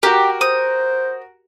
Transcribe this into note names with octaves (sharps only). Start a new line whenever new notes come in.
F#4 G4 A#4
C5 D#6